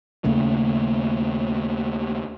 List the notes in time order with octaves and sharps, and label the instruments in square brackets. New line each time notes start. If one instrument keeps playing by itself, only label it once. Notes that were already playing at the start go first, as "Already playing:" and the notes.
[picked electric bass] D#2 C#3 A3 A#3